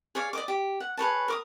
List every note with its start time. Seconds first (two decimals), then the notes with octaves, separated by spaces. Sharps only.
0.15 G#4 C#5 D5 F5
0.33 D5 D#5 D6
0.48 G4
0.80 F#5
0.97 G#4 B4 C#5 A5
1.28 A#4 D6 D#6